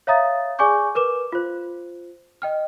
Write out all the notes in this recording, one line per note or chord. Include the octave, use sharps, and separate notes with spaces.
C#5 E5 F5 A#5 D#6 A6
G#4 D5 G#5 C#6 D6 G6
A#4 B4 D6 E7
F4 C5
D#5 G5 F6